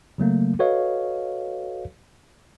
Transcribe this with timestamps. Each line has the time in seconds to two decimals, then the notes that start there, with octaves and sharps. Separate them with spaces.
0.18 C#3 F#3 A3 A#3
0.59 F#4 A4 B4 C#5 D#5 F5